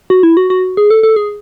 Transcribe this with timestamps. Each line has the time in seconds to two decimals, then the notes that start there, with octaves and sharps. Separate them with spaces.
0.10 F#4
0.23 E4
0.37 F#4
0.50 F#4
0.77 G#4
0.90 A4
1.03 A4
1.16 G#4